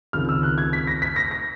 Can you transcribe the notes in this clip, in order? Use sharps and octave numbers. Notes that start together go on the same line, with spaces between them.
C#2 C3 D#3 F6
E6
F#6
G#6
B6
A#6
B6
A#6
A#6